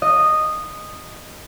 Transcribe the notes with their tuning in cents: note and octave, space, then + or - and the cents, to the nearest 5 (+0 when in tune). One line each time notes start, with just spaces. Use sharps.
D#5 -10